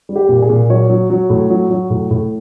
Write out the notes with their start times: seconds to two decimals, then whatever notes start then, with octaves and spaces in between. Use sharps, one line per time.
0.09 G3
0.16 G4
0.29 A#2
0.42 G#4
0.49 A#2
0.70 F#3 C#5
0.90 F#3
1.10 F#3
1.30 A2
1.50 F#3
1.71 F#3
1.90 A2
2.11 A2